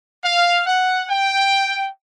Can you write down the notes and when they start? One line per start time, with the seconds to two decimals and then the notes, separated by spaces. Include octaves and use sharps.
0.24 F5
0.67 F#5
1.10 G5